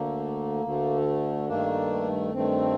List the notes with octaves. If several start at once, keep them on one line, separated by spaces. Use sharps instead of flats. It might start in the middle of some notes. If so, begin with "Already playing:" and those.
Already playing: D2 D3 A3 A#3
D2 D3 A3
G2 D#3 A3 A#3 D4
G2 D#3 A3 C4